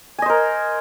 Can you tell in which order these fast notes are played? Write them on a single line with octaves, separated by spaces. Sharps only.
G#5 D#5 C5 A#4